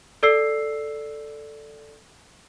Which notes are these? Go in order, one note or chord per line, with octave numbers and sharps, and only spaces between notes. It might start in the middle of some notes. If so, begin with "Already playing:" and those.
A4 D5 E6 C7